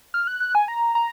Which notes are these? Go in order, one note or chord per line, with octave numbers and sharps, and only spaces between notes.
F6
F#6
F#6
G#5
A#5
A#5